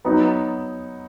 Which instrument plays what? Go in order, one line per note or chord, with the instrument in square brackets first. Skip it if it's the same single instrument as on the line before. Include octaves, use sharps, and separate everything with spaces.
[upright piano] F#3 B3 D#4